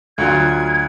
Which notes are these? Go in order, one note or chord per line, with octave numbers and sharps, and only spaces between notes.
D2 F#3 F4 G#6